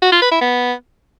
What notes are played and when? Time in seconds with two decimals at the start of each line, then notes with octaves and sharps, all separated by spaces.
0.02 F#4
0.12 F4
0.22 B4
0.31 E4
0.41 B3